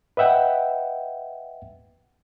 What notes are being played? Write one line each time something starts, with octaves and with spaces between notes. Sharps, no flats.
B4 D#5 E5 F#5 G5